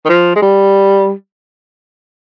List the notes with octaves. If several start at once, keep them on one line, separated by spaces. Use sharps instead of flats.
D#3
F3
G#3
G3